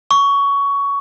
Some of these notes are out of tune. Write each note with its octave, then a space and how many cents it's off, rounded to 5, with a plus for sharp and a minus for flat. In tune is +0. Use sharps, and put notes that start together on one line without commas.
C#6 +15